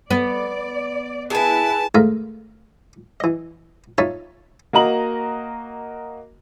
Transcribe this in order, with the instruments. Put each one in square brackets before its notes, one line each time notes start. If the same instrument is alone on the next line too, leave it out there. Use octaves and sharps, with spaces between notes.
[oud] B3 [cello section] D5
[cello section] E4 B4 [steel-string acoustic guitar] G#4 G#5 [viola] A5
[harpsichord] G#2 D#3 A3 E5 F5 A#5
E3 D#5
D#4 F4 C#5 E5 A5
[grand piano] A#3 F#4 D#5 A#5 F#7